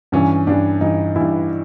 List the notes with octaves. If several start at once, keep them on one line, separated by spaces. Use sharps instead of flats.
G2 E3 C#4
G2 E3 D4
G2 E3 D#4
G2 E3 E4